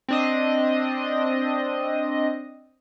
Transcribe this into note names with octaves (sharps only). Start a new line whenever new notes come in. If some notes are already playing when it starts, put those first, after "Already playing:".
C4 D4 D#5